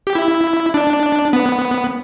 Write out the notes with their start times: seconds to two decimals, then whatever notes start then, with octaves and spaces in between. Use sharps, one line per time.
0.07 G4
0.15 E4
0.74 D4
1.33 B3